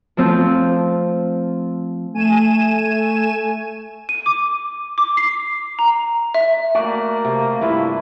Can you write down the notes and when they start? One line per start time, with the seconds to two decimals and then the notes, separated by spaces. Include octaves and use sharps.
0.17 F3 A3 C4 F4
2.14 A3 G#5 D#7 E7
4.09 D#7
4.26 D6
4.98 D6
5.17 C7
5.79 A#5
6.34 E5
6.75 A3 A#3 F#4 D5
7.25 C3
7.61 G2 E4 F4 B4